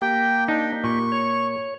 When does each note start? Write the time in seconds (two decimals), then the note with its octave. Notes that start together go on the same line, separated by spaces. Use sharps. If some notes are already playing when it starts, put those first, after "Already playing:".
0.02 A#3 G4 G5
0.48 D4 D#4
0.84 A#2 C#6
1.12 C#5